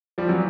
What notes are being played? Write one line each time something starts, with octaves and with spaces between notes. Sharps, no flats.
F3 G3
E3 F#3